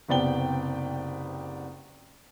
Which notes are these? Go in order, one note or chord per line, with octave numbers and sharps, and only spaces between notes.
F#1 C3 B3 D5 G5 G7